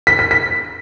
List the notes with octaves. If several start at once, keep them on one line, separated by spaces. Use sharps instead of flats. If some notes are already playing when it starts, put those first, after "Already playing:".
B6
B6
B6